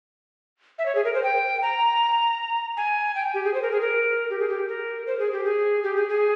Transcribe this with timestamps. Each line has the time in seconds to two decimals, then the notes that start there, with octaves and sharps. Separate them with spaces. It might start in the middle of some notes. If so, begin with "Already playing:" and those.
0.79 E5
0.86 C#5
0.95 G#4
1.05 A#4
1.14 C5
1.23 G5
1.62 A#5
2.77 G#5
3.15 G5
3.34 G4
3.44 G#4
3.54 C5
3.62 A#4
3.72 G#4
3.81 A#4
4.30 G4
4.39 G#4
4.49 G4
4.68 A#4
5.07 C5
5.19 G#4
5.32 G4
5.45 G#4
5.83 G4
5.96 G#4
6.09 G#4